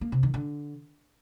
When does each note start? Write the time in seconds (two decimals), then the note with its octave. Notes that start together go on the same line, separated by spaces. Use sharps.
0.01 A#3
0.12 C3
0.23 D#3
0.34 D3